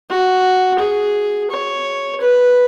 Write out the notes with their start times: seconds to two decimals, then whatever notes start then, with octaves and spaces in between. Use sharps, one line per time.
0.09 F#4
0.79 G#4
1.51 C#5
2.21 B4